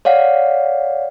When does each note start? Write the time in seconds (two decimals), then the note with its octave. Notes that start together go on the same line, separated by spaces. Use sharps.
0.05 C#5 D5 F5 F#5